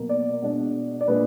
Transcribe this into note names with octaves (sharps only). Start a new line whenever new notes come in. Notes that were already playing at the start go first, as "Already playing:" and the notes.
Already playing: B2 F#3 A#3
D5
B2 G#3 D4
D5
A#2 G#3 D4 B4